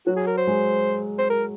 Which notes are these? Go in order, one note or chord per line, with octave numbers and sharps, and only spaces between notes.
F#3 F#4
G#4
A#4
C5
G#3
C5
A#4